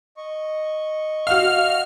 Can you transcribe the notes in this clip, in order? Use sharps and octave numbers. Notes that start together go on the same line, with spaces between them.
D#5 C#6
F#4 F5 F6